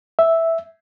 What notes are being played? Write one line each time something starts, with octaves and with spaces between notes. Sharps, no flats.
E5